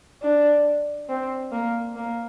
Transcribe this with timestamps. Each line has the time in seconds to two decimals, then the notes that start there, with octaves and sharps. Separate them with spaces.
0.22 D4
1.09 C4
1.52 A#3
1.96 A#3